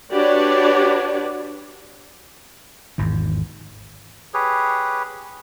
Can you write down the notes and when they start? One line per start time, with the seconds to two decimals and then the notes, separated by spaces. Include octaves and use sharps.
0.12 D4 F#4 G4 B4 C#5 D5
2.98 G#1 E2
4.34 G4 G#4 B4 C#5